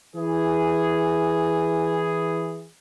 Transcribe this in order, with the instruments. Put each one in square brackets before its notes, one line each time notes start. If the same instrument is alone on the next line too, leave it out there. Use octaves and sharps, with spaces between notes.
[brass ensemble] E3 G#4